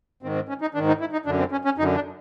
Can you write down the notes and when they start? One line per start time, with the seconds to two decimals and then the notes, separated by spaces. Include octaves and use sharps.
0.22 G#2 D#3 C4
0.35 C4
0.49 C#4
0.61 D#4
0.74 G#2 D#3 D4
0.88 D#4
1.00 E4
1.12 D#4
1.25 F#2 D3 D4
1.39 C4
1.52 C#4
1.65 C#4
1.77 F#2 D3 D#4
1.95 D4